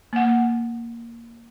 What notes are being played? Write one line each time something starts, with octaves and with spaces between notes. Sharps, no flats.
A#3 F#5